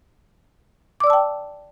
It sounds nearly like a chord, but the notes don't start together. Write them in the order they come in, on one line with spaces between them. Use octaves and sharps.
D6 D5 E6 A5 G5